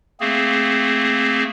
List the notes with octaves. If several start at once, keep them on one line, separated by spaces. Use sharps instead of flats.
A3 A#3 C4 G#4